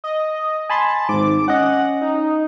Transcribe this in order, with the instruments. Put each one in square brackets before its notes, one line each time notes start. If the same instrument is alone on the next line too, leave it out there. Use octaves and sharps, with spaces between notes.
[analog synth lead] D#5
[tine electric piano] G#5 B5 C6 [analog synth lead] A5
[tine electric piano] G#1 G#2 [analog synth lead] D6
[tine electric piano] C#4 D#5 [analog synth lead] F#5
[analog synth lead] D#4